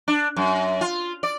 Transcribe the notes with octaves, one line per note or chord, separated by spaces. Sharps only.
D4
F#2
F4
D5